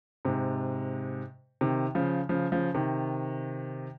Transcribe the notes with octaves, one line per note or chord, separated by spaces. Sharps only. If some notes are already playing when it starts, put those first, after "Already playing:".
G#2 C3
C3 D#3
C#3 F3
C#3 F3
C#3 F3
C3 D#3